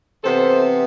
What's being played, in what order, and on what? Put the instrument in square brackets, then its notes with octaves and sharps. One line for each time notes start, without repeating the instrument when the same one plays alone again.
[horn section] C3 E3 B3 A4 C5